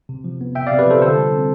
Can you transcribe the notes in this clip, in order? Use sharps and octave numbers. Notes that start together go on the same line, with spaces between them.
C3
F3
B3
C3 E5 G5
C3 D5 F5
G4 B4
F3 A4 C5
D3 A4 C5
G3
C4